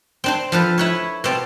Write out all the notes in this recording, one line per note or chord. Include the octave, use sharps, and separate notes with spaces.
C4 D4 C5
F3 A4 B4
E4 B4 C#5
B2 C4 A5